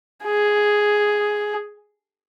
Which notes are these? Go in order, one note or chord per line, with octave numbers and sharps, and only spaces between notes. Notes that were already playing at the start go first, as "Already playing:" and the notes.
G#4